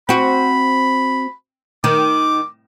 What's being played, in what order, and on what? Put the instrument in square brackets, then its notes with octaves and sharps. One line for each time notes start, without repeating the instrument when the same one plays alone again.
[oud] C4 F#4 [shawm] B5
[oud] D#3 [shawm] D6